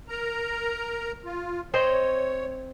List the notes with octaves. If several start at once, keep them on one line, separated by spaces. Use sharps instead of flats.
A#4 A#5
F4
C4 C5 C#5 D#5